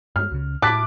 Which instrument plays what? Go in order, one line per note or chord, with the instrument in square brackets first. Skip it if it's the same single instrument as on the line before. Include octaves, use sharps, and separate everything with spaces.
[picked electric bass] G2 G#3 [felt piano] F6
[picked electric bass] C#2 C#3
[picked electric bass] A2 [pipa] E4 A5 [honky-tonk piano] D6 [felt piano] F#6 B6